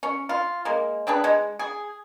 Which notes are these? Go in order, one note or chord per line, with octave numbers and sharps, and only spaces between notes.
C#4
F4
G#3 A#3
C4 D4 G#4 B4
G#3
G#4